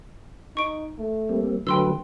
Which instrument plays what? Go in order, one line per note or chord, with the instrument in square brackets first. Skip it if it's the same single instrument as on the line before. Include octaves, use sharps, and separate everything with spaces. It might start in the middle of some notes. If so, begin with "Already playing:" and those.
[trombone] D#4 [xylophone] C#6 D7
[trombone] A3
[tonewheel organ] G3 A#3 C4
[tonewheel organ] D3 F#3 B4 [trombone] A3 [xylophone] G5 C6 E6